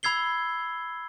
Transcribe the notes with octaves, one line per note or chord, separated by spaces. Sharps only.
B5 E6 G#6 C7 G7